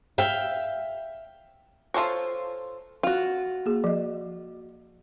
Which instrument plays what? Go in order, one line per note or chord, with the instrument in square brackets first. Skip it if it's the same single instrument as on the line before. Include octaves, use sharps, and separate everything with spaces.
[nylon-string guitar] E5 F5 G5
[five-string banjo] F4 A4 C5 C#5
F4 F#4
[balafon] A#3 G#4
F3 D#5